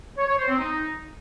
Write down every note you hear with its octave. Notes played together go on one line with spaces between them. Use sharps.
C#5
C#5
C5
C4
D#4